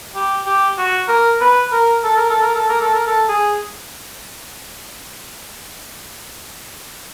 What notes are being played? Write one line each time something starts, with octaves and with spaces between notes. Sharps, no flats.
G4
G4
F#4
A#4
B4
A#4
A4
A#4
A4
A#4
A4
A#4
A4
A#4
A4
G#4